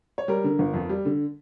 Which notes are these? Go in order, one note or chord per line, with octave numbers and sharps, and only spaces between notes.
C#5
G3 A#4
D3
G1
F2
G3
D3